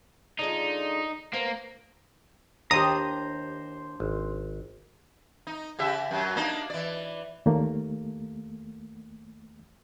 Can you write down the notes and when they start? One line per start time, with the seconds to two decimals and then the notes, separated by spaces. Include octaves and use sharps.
0.39 D3 G#3 D#4 F4
1.33 A#3 B3 C5
2.71 D#2 D4 E4 G4 C5 A#5 D#6
4.00 G#1
5.47 D#4
5.79 C#3 G4 E5
6.11 F#2 F#3
6.36 A#3 D4 D#4
6.70 E3 D5
7.46 D#2 A3 A#3